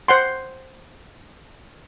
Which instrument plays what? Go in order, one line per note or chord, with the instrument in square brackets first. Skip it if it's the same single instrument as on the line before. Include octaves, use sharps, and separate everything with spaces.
[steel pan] C5 F#5 C6